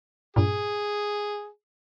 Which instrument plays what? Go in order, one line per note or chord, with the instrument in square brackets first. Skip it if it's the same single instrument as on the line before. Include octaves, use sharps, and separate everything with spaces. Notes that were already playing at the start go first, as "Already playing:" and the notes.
[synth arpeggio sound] G2 A#2 [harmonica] G#4